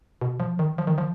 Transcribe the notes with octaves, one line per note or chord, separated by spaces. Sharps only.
B2
F3
D#3
F3
D#3
F3